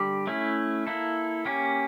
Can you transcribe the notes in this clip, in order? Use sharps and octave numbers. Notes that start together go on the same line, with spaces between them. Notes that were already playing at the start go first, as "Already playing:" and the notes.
Already playing: D3 G3 G4
A3 C#4 E4
A#3 E4 A4
A#3 C#4 G4